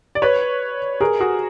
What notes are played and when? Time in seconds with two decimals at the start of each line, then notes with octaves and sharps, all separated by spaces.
0.15 D5
0.22 B4 C#5
1.01 G#4 A#4
1.20 F#4 G#4